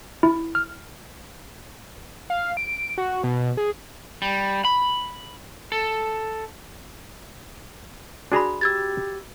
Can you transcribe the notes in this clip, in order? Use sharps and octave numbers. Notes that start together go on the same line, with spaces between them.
E4
F6
F5
D7
F#4
B2
G#4
G3
B5
A4
D4 F#4 G#4 A#5 B5
G4 E6 G#6 A6